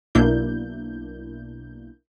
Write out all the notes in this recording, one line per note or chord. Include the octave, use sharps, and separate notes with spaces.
B1 B2 A#3 D4 E4 G6